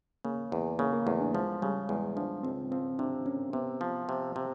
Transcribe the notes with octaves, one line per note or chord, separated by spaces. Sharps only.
C#3 A#3
E2
C#3 A#3
A#3
E2 A3
D4
F3 G#3
C#3 G3
E2 G#3
F3 D4
C#2 C4
F3 C4
C3 D4
A#3 C#4
C3 B3
F3
C3
C3